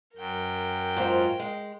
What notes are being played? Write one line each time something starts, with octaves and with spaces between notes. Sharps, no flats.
F#2 A#4 G5
G#2 F4 C5
G#3